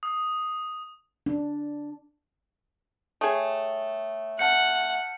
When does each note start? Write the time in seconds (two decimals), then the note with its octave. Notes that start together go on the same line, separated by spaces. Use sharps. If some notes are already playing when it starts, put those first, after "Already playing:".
0.03 D#6
1.26 D4
3.21 A3 G#4 C#5 G5 D#6
4.39 F#5 A5 F6 G6 C#7